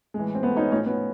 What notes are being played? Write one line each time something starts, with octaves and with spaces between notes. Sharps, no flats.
A2 E3 G#3
C4
A3 B3
C#4 D#4
A2 F3 C#4 D#4
B3 C#4